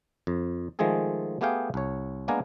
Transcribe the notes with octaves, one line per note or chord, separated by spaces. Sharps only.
F2
D#3 F3 G#3 A3 G#4 A4
A3 B3 G4 G#4 F5 G5
C2 C#5
G#3 A#3 B3 D4 A#4 G#5